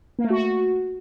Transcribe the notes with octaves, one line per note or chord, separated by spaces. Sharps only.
A#3
A3
F#4